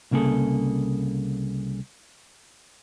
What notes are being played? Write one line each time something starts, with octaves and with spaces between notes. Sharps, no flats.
C2 C#3 A#3 G#4 A4